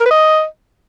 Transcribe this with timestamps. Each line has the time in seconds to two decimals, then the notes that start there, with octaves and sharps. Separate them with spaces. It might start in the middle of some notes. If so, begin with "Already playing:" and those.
0.01 A#4
0.06 B4
0.11 D#5